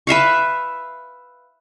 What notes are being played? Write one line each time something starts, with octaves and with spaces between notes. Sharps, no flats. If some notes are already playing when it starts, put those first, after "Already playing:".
B4 E5 F5 C#6